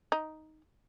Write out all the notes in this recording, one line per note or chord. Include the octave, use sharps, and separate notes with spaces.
D#4